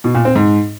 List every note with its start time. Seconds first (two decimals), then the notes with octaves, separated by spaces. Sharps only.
0.04 B2
0.15 A#2
0.25 C4
0.35 G#2